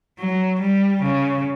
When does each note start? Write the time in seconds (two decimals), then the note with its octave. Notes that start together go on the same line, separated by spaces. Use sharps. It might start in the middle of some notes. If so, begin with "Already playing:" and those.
0.19 F#3
0.61 G3
1.03 C#3